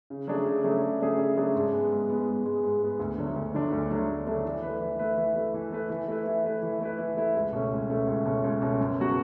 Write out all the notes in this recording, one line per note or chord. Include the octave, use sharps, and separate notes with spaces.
C#3
F#3 A3 D4 G#4
C#3
F#3 A3 D4 G#4
C#3
F#3 A3 D4 G#4
C#3
F#3 A3 D4 G#4
G#2
G#3 B3
G#2
G#3 B3
G#2
G#3 B3
G#2
G#3 B3
D2
D3 F#3 A3 D4
D2
D3 F#3 A3 D4
D2
D3 F#3 A3 D4
D2
D3 F#3 A3 D4
E3
A3 E4 B4
E3
A3 E4 B4
E3
A3 E4 B4
E3
A3 E4 B4
E3
A3 E4 B4
E3
A3 E4 B4
E3
A3 E4 B4
E3
A3 E4 B4
C#2
B2 A3 C#4
C#2
B2 A3 C#4
C#2
B2 A3 C#4
C#2
B2 A3 C#4
F#2
C#3 F#3 B3 F#4